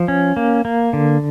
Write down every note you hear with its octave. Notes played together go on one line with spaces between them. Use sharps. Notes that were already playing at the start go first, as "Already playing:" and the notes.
Already playing: F3
C#4
A#3
A#3
D3